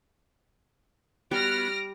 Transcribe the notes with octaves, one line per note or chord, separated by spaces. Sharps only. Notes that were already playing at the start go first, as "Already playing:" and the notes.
G3 B3 F#4 F6 A#6 D7